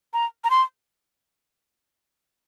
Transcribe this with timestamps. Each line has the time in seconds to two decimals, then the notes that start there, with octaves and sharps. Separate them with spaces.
0.13 A#5
0.44 A#5
0.50 C6